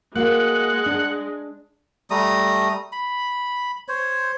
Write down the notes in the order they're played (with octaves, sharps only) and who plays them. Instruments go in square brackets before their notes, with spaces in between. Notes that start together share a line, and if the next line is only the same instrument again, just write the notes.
[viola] G#3 [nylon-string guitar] A#3 F#4 [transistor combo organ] F#5
[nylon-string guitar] D4
[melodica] G3 A3 A#5 D#6
B5
C5 C#5